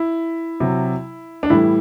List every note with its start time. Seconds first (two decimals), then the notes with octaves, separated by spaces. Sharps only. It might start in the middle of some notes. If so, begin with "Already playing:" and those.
Already playing: E4
0.60 C3 F#3
1.43 D4
1.50 A2 E3 G3 E4